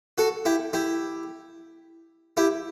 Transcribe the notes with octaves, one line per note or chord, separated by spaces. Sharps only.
F#4 A4
E4 G4
E4 G4
E4 G4